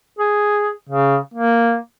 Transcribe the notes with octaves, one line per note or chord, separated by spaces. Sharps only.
G#4
C#3
A#3